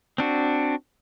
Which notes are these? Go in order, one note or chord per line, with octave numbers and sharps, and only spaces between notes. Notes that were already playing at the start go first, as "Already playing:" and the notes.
C4 D4 F#4